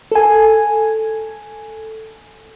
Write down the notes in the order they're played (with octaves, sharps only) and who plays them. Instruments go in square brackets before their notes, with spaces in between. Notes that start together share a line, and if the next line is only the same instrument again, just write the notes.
[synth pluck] A4 G#5